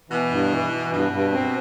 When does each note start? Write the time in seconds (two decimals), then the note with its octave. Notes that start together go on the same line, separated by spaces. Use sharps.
0.10 B2 E3
0.30 G2
0.51 E3
0.72 E3
0.91 G2 B2
1.12 G2
1.32 C4